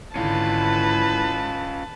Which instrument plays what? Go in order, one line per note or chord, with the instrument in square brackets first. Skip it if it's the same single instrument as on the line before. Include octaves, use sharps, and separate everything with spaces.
[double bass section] G#1 D3 [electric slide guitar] C#4 F4 [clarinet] E4 [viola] B4 A5